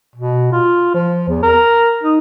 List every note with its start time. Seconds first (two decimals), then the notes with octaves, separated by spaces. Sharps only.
0.15 B2
0.52 F4
0.94 F3
1.28 E2
1.43 A#4
2.03 D#4